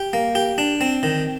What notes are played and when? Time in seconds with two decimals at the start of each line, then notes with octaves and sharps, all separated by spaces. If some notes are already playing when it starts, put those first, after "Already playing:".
Already playing: G4
0.13 A#3
0.35 G4
0.58 D4
0.81 C4
1.03 D#3